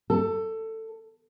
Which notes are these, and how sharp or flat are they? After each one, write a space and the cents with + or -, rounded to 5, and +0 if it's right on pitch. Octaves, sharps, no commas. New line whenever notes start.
A4 +15